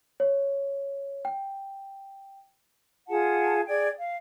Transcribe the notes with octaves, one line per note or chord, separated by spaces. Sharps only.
C#5
G5
F4 G#4 F#5 A5
G#4 D5 G5 G#6
F5